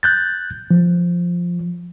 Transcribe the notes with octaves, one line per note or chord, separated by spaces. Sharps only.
F#6 G6 A6
F3